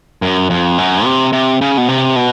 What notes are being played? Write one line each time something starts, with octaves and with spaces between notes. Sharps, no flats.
F#2
F2
F#2
C3
C3
C#3
B2
C3
B2